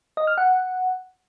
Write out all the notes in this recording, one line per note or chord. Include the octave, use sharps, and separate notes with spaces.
D#5
F6
F#5